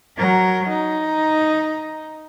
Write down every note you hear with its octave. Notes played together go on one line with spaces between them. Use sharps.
F#3 A#4
D#4